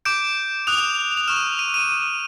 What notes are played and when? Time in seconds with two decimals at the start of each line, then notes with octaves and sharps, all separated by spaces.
0.05 D6 G6 D7
0.67 D#6 F#6 F7
1.17 F7
1.28 C#6 F6 E7
1.59 D#7
1.74 D#7